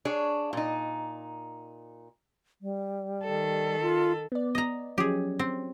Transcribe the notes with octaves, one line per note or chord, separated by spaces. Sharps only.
D4 G#4 C#5
A#2 D#4
G3
D#3 A4
F4
B3 D5
D#5 A#5
F3 F#3 C#4 G4 G#4
C4